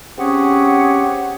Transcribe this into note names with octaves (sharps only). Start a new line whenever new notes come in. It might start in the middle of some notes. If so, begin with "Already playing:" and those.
C4 C#4 G4 G#4 C#5 F#5